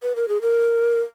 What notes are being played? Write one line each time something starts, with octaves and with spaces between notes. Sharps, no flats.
B4
A#4
G#4
A#4